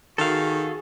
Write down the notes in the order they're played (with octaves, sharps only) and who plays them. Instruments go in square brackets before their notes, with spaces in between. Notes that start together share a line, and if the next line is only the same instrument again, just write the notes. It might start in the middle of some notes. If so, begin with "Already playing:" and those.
[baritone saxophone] D#3 [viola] F#4 G#4 [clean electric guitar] A4 F5